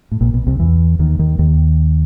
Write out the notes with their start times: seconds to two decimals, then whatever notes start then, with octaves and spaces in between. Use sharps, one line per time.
0.12 A2
0.21 A#1 A#2
0.34 B1 B2
0.47 C2 C3
0.59 E2 E3
0.99 D#2 D#3
1.19 D#2 D#3
1.39 D#2 D#3